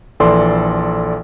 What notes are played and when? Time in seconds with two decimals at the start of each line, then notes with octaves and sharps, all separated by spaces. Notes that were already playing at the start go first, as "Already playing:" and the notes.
0.20 A#1 E3 A4 D5 C6